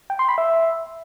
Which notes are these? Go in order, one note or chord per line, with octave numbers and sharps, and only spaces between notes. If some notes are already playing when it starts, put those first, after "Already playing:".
G5
C6
B5
E5